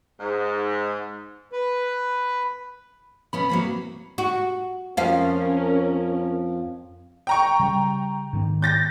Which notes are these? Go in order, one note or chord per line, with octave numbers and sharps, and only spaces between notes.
G#2
B4
B2 B3 C#4 B5
F#3 A#3 C4
F#4
F2 F3 C#4 A#4 F5
G5 A#5 C#6
C#3 G3
G#2 D#3 B3
G6 A6 A#6